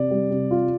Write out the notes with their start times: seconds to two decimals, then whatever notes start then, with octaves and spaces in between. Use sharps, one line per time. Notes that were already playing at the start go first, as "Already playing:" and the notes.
Already playing: C3 D5
0.11 G3
0.31 C3
0.51 F4